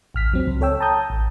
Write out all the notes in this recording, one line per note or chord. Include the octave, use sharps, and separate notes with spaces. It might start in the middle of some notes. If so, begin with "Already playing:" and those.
A1 F6 B6
D#2 F#3 C4
C#2
A4 C#5 G5 E6
A5 A#5 D#6 G6
A1